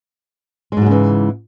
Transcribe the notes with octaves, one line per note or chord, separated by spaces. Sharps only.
G#2 C#3 E3 F#3 G#3